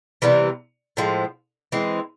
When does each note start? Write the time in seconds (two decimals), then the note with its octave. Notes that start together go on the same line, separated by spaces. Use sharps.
0.22 C3 E3 G3 B3
0.97 A2 F3 G#3
1.72 E3 G#3 C4